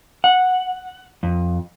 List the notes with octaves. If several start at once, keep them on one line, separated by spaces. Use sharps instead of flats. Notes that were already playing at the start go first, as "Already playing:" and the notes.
F#5
F2